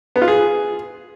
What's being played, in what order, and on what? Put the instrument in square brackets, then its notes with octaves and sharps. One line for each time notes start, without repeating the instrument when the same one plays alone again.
[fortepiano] B3
F4
G#4